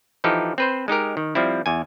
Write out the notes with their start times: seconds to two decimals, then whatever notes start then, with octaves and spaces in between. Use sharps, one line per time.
0.24 E3 F3 D#4 G4 A4
0.58 C4 B4 C5
0.88 G#3 D#4 G4 A#4
1.17 D#3
1.35 F3 G3 C4 E4
1.66 E2 G#5